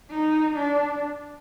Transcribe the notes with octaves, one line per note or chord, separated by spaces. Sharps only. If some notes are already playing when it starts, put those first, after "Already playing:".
D#4
D4